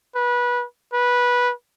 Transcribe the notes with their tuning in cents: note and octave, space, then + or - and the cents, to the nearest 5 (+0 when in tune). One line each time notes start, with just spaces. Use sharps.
B4 -20
B4 -15